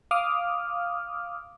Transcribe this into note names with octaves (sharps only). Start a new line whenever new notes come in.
F5 D6 D#6 F6